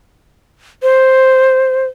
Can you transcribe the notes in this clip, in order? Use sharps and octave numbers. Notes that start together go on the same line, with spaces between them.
C5